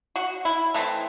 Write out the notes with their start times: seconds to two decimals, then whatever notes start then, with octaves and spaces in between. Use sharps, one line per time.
0.16 F#4
0.45 E4
0.74 E3 A3 C4 D#4